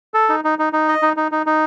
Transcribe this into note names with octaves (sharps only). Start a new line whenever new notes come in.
A4
D#4
D#4
D#4
D#4
D#5
D#4
D#4
D#4
D#4